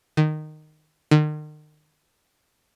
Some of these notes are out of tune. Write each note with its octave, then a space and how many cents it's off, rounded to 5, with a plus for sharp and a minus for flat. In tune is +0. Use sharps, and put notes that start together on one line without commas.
D#3 -15
D#3 -40